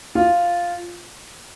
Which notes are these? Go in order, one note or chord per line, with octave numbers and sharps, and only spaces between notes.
F4